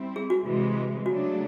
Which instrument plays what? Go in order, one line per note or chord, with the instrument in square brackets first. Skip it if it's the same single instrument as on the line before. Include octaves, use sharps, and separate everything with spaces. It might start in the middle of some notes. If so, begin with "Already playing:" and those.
Already playing: [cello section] G3 C4 E4
[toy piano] G#4
F#4
[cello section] C3 E3 G#3
[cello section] C#3 F#3 A3 D4 [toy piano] F#4